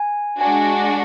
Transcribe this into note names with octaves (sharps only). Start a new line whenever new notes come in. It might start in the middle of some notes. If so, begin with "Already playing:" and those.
Already playing: G#5
G#3 D4 F#4 G#5